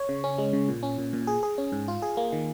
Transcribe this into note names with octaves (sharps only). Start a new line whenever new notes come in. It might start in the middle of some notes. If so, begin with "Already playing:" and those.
Already playing: C#5
C#3
C#4
G#3
C#3
A#2
C#4
A#2
A#2
G#4
G#4
C#4
G#2
F4
G#4
A#3
D#3